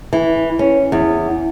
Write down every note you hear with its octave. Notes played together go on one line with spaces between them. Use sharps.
E3
C#4
E2